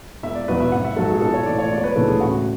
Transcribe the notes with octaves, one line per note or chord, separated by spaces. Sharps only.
E1 E5
D5
E2 B2 F#3 B4
E5
G#1 F#5
E5
G#2 F#3 A4
G#4
B1 A4
C#5
A2 E3 D5
C#5
E1 D5
C#5
B4
D2 C#3 E3 A4
G#4
A1 F#4